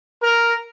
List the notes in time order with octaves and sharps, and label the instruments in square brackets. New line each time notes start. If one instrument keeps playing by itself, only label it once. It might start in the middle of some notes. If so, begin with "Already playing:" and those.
[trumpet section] A#4